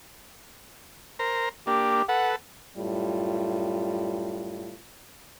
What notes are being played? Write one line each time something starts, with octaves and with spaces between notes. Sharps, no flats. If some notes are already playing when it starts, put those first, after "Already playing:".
A#4 C5 A#5
A#3 D4 G4
A4 B4 F#5
F#2 A2 G3 F4